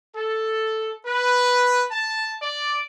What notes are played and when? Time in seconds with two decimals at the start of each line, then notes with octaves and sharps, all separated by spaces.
0.15 A4
1.06 B4
1.90 A5
2.41 D5